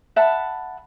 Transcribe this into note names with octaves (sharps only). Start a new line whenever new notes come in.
E5 F#5 A5 B5